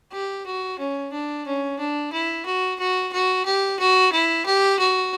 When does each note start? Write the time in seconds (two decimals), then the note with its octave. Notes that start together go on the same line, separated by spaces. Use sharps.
0.12 G4
0.46 F#4
0.79 C#4
1.12 D4
1.46 C#4
1.79 D4
2.13 E4
2.46 F#4
2.79 F#4
3.13 F#4
3.45 G4
3.79 F#4
4.12 E4
4.46 G4
4.79 F#4